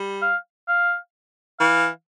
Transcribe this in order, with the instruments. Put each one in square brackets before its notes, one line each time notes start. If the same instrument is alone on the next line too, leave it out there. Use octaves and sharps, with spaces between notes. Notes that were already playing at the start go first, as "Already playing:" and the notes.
Already playing: [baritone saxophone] G3
[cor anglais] F5
F5
[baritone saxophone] E3 [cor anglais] F5